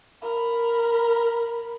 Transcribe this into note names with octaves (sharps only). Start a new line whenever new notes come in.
A#4 B5